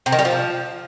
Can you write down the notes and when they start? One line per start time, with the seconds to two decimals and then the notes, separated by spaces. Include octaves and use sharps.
0.06 C3
0.12 D#3
0.19 G3
0.25 F3